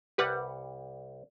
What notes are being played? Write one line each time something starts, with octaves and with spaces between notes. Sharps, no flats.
C2 G3 G4 B4 F#5